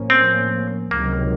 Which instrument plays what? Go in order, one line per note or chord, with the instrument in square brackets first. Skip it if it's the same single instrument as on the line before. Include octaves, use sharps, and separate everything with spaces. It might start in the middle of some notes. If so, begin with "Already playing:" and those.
Already playing: [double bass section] A2 F3 A#3 C#4
[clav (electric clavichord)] C4
[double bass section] C#2 C3 D#3 F#3 [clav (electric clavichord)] A#3